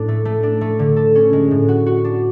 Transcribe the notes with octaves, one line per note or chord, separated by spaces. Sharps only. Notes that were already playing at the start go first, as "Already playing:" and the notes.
Already playing: A2 D4
A3
A3
D4
A3
D3
A4
C#4
G#3
A2
F#4
F#4
D4